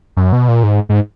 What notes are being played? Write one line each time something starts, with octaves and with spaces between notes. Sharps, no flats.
F#2
B2
A#2
G#2
G#2